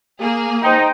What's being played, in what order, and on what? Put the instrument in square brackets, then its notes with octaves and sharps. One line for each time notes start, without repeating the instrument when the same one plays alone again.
[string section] A#3 G#4
[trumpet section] D#4 [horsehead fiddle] C5 G5